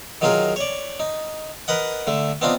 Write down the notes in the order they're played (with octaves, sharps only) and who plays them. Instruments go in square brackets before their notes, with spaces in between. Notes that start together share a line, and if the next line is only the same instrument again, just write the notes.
[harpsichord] D#3 F#3 D#4 F4 G#4 A#4
C#5 D5
D#4
A#4 B4 D#5 F#5
D3 A3
B3 C4 D4 D#4 F4